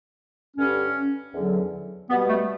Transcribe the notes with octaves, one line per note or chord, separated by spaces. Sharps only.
G2 D3 G3 C#4
E2 D3 F#3
B2 G3 B3
A3